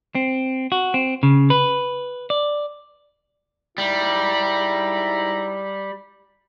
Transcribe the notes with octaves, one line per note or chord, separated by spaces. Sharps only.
C4
F#4
C4
C#3
B4
D5
G#2 G3 E4 A#5